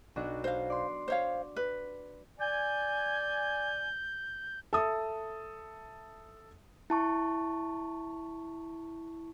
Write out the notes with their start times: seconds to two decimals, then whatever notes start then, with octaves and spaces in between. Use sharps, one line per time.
0.16 B1 D4 F#4
0.44 C5 F5
0.70 D5 C6
1.08 C5 C#5 F5
1.56 B4
2.40 D5 G#5 G6
4.73 A4 E5 D#6
6.90 E4 A5 C#6